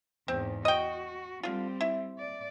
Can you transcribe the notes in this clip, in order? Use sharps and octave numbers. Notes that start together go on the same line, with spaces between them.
E2 G#2 C4
F#4 D#5 G5
D3 G3 C4 F4
E4
D5